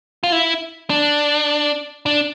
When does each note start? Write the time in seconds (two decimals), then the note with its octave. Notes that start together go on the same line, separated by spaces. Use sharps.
0.23 F4
0.32 E4
0.90 D4
2.06 D4